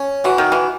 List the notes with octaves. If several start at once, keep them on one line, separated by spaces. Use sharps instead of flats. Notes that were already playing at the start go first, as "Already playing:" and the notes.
Already playing: C#4
E3 F#4
D#3
E3